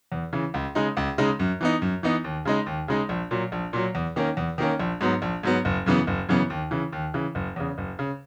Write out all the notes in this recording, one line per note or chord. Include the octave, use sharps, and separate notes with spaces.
E2
C#3 E3
C#2
C#3 G#3 D#4
C#2
C#3 G#3 D#4
F#2
E3 B3 D#4
F#2
E3 B3 D#4
D#2
C#3 G#3 D#4
D#2
C#3 G#3 D#4
A#1
A#2 F#3
A#1
A#2 F#3
E2
D#3 A#3 C#4
E2
D#3 A#3 C#4
A#1
G#2 F#3 B3
A#1
G#2 F#3 B3
F#1
F#2 C#3 E3 B3
F#1
F#2 C#3 E3 B3
D#2
C#3 E3
D#2
C#3 E3
F#1
E2 C#3
F#1
C#3